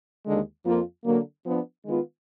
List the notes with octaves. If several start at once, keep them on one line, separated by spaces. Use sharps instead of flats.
D#2 D3 G#3
F2 F3 A#3 F4
D3 F#3 A#3
F3 B3 D4
D#3 G#3 B3 F4 B4